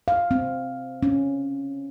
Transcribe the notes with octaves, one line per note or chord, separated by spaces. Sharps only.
F5
C4
C#4